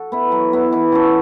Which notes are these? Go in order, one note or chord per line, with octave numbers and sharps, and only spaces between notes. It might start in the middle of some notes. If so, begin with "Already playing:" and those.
Already playing: F#4 A4
B3 E4
F#3
B3 E4
E3
C#4 F#4 A4